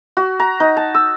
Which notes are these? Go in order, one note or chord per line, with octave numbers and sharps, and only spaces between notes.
F#4
A#5
D#4
A5
E6